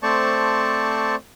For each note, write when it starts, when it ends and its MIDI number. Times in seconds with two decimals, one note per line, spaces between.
0.03 1.15 57
0.03 1.15 60
0.03 1.15 72
0.03 1.15 74
0.03 1.15 81
0.03 1.15 85